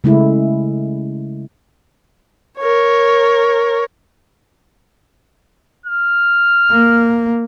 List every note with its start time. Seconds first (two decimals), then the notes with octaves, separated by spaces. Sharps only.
0.04 C#3 G#3 A3 E4
2.58 A#4 C#5
5.86 F6
6.71 A#3